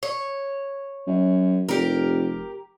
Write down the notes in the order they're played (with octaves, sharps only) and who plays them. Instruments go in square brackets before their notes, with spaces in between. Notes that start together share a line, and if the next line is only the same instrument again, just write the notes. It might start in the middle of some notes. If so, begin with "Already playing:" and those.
[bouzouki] C#5
[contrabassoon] F#2
[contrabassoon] F1 [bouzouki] G4 A#4